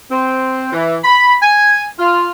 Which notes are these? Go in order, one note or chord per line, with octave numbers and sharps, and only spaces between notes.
C4
E3
B5
G#5
F4